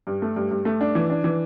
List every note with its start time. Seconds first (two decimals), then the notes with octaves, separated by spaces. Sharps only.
0.07 G2
0.22 A3
0.36 G2
0.51 G2
0.65 A3
0.81 D4
0.95 E3
1.10 D4
1.24 E3